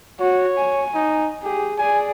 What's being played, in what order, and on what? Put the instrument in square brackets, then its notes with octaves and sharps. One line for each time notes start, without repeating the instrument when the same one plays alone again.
[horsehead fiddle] F#4 [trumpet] C#5
[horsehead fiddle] G#5
[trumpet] D#4
[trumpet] G4 [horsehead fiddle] G#4
[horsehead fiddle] G#4 D5 [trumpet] G#5